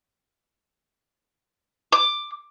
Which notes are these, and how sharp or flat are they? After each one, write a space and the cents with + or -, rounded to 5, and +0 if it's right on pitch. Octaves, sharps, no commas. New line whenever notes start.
D6 +10